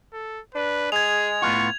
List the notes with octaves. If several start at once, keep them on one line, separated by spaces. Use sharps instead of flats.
A4
D4 B4
G#3 G#4 G#6 F7
A2 B3 F4 C#6